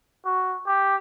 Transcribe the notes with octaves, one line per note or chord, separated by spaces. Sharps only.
F#4
G4